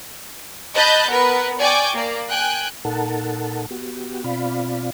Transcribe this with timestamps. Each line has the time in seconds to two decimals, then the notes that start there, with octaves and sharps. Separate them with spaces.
0.75 D#5 A5 B5 F#6 G6 A6
1.08 B3 A#4 B4
1.59 D5 G5 G#5 C#6 D6
1.94 A#3 D5
2.28 G5 G#5 F#6
2.85 A#2 D#4 A4 A#4 F#5 A5
3.71 B3 F#4 G4
4.24 B2 C4 F4 D5 F5 B5